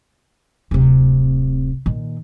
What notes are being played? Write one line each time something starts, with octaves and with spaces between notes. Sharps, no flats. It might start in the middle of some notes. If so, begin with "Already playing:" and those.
D1 C3
A#2 D#3